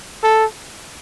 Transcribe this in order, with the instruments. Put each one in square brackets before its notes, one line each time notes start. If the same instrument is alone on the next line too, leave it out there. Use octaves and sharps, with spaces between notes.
[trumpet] A4